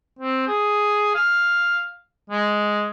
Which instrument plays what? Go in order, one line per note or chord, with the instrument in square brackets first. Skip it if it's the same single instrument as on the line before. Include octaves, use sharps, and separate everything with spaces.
[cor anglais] C4
G#4
F5
G#3